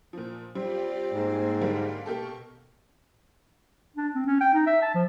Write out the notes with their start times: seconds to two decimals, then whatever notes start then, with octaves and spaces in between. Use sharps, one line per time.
0.13 A#2 F3
0.55 G3 C4 F4 G4 D5
1.14 G#2 A#3 G#5
1.61 D3 G3 A#3 F5 C6
2.06 B2 A#3 G4 A4 C#6
3.96 D4
4.15 C4
4.26 C#4
4.41 G5
4.54 D#4
4.66 E5
4.82 A5
4.94 F3